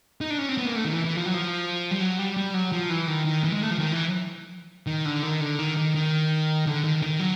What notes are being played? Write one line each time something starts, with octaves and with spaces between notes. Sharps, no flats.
D#4
D4
C#4
C4
B3
A#3
A3
D#3
E3
E3
F3
F#3
F3
G3
F#3
G3
G3
F#3
F3
E3
D#3
D#3
E3
G#3
A3
F3
D#3
E3
D#3
D3
D#3
D3
D#3
D#3
D#3
D3
D#3
D#3
F#3